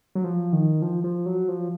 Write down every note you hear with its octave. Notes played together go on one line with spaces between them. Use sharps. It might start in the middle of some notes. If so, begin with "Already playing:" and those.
F#3
F3
D#3
F3
F3
F#3
F3